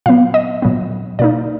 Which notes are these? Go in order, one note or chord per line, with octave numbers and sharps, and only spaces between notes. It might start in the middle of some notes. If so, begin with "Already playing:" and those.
A#2 F#3 B3 F5
D#5
A#2 F#3 B3
B2 A#3 D#4 D5